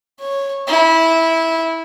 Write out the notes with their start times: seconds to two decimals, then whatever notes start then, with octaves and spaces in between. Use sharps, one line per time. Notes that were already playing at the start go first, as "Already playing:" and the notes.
0.20 C#5
0.68 E4